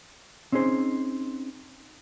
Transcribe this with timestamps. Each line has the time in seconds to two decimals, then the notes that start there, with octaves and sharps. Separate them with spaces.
0.52 C4 C#4 D#4 G#4 C5